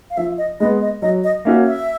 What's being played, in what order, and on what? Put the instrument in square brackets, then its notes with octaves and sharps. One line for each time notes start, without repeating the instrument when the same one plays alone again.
[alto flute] F5
[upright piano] F3 [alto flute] E5
[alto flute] D#5
[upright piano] G#3 B3 [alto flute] D#5
[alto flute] D#5
[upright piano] F#3 [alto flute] D#5
[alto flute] D#5
[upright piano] A#3 C#4 F#4 [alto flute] E5
[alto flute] E5